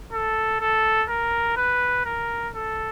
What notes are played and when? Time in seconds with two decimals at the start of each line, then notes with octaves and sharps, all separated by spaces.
0.13 A4
0.61 A4
1.09 A#4
1.57 B4
2.05 A#4
2.54 A4